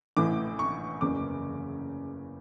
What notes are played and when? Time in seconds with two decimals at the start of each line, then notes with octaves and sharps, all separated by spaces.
0.17 A1 A2 E3 D6
0.59 C#6
1.01 F#1 E2 C#3 D6